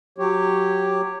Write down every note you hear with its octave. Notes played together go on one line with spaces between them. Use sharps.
F#3 G4 C#5